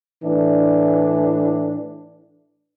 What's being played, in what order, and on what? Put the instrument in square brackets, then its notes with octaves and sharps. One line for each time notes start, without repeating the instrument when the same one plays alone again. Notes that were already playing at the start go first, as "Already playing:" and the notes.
[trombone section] A2 E3 D4